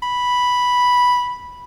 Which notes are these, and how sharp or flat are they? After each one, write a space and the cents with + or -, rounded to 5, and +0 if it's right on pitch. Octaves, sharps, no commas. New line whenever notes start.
B5 -5